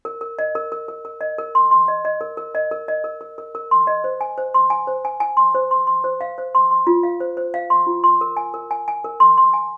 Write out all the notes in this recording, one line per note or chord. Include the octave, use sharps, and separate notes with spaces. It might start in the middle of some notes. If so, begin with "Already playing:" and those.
A#4
A#4
D#5
A#4
A#4
A#4
A#4
D#5
A#4
C6
C6
D#5
D#5
A#4
A#4
D#5
A#4
D#5
A#4
A#4
A#4
A#4
C6
D#5
C5
G#5
C5
C6
G#5
C5
G#5
G#5
C6
C5
C6
C6
C5
F5
C5
C6
C6
F4
F5
C5
C5
F5
C6
F4
C6
A#4
G#5
A#4
G#5
G#5
A#4
C6
C6
G#5